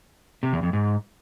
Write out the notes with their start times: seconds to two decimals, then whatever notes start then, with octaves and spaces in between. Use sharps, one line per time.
0.43 C3
0.53 E2
0.63 F2
0.73 G#2